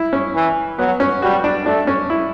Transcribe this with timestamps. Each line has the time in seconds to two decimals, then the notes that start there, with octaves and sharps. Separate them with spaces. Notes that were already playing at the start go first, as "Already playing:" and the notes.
Already playing: E4
0.13 C#4
0.35 E3
0.78 F#3 B3
1.00 C#4
1.22 G3 F#4
1.44 D4
1.66 A3 D4
1.87 C#4
2.10 E4